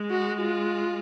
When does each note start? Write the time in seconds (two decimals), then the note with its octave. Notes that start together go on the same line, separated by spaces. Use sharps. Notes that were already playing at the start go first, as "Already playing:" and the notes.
Already playing: G#3
0.10 F#4
0.41 F4